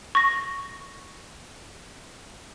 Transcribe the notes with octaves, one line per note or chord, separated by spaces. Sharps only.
C#6 A#6